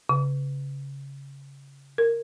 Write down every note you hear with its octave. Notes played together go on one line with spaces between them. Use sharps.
C#3
A#4